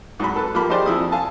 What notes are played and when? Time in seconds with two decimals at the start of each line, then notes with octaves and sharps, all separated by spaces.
0.20 G#2 F#3 B5
0.36 A4 B4
0.54 F3 A#3 G4 B5
0.69 A#3 D#4 G4 G#4 C5 D5
0.86 F2 E4 D#6
1.12 F5 G#5 A5